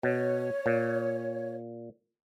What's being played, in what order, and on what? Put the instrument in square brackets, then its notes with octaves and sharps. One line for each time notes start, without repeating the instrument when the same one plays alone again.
[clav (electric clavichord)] B2 [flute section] C#5
[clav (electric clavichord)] A#2